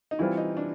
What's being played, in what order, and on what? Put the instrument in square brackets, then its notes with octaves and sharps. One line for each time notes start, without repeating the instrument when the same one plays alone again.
[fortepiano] D#4
[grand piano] E3 G3 C4 F4 [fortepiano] E4
[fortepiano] D#4
D4